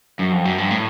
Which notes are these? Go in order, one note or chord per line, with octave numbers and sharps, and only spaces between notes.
F#2
F2
F#2
G2
A2